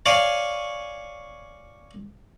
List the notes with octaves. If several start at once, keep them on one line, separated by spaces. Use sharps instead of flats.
C#5 D5 F5 G#5